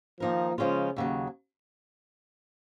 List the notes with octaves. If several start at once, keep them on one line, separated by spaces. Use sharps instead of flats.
D#3 F3 A#3 D#4 A#4
C#3 F3 G#3 C#4 F4
D#2 C#3 F#3